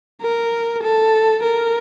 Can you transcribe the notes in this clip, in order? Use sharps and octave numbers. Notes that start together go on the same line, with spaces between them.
A#4
A4
A#4